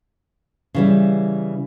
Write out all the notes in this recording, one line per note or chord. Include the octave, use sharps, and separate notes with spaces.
C#3 E3 G3